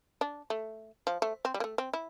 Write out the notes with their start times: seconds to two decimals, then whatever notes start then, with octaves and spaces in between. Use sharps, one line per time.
0.21 D4
0.50 A3
1.07 F3
1.22 A3
1.45 C4
1.54 G3
1.60 A#3
1.64 A3
1.78 C4
1.93 E4